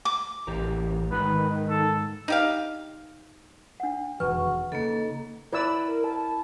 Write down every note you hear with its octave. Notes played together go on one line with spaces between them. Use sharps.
D6
A1 E3 G4 A#4
G#2 D#3 B4 B5
A4
D#4 G4 F5
D4 F#5
E1 F2 D#3 F#4 B4 C#6
C#3 A#3 D#4 A4
E4 B4 D5 E5 E6
A#4
A5